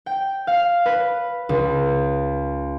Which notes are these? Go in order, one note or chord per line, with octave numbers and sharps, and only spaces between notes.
G5
F5
B4
C#2